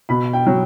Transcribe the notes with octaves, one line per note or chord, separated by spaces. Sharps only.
B2 B5
G5
F#3